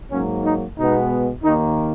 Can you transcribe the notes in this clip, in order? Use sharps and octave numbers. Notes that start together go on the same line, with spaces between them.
G#2 F#3 A#3 C#4
D#4
B2 G#3 B3 D#4
D#2 D#3 A#3 D#4